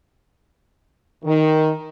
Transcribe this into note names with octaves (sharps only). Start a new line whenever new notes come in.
D#3